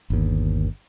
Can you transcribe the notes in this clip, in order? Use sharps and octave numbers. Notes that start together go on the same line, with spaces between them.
G1 D#2